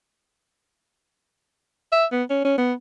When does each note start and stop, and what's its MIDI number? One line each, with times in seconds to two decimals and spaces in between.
1.93 2.05 76
2.12 2.23 59
2.30 2.42 61
2.45 2.56 61
2.58 2.73 59